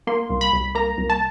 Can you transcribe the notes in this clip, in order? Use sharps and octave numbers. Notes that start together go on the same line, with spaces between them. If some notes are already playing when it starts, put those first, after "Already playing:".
A#3 C6
C2
B5
C2
A#3 A#5
C2
A5